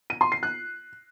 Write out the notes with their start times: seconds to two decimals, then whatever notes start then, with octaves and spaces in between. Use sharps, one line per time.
0.10 D#7
0.21 C6
0.32 C7
0.43 F#6